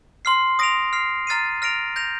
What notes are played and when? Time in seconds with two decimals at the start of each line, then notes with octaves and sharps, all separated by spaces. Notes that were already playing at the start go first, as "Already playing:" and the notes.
0.25 C6 F6 C7
0.59 D#6 A#6 D7 F7
0.93 F6 C7 F7
1.27 A#5 F6 A6 C7 D#7
1.62 F6 A#6 D7 F7
1.96 G6 A#6 F7